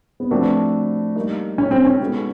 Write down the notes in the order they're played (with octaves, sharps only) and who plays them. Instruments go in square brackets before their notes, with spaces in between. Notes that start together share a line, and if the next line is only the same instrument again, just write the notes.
[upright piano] B3
[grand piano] F3 A3 D4 F#4 B4 [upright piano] C4
[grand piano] G3 A#3 D#4
[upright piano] C#4
C4
C#4
[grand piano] G#3 B3 D#4 F#4 A4